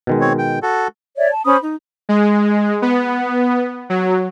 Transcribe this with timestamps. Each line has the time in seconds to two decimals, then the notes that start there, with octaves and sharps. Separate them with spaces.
0.07 B2 D#3 G#3
0.21 C4 C#5
0.38 G5
0.63 F#4 A4
1.17 C#5 D5 E5
1.30 A5
1.45 C#4 C5 B5 D#6
1.60 D#4
2.09 G#3
2.82 B3
3.90 F#3